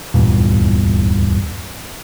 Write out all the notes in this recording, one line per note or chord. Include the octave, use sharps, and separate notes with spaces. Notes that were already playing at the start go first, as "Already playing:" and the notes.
D1 E2 G2 A#2